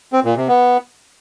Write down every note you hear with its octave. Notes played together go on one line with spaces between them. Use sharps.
C4
A#2
C3
B3